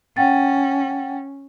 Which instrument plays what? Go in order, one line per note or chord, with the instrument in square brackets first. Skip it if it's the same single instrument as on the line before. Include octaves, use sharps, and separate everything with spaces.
[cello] C#4 [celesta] F#5 G5 A6